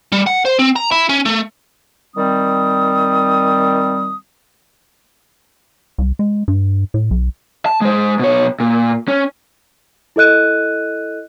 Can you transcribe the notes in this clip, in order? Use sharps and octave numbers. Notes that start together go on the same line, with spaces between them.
G3
F#5
C5
C4
A#5
E4
C#4
A3
D#3 G3 C4 D#6
C2
G#3
G2
A2
B1
A5
G#3 C5
B2 C#5
A#2
C#4
E4 A4 D#5 F#6 D#7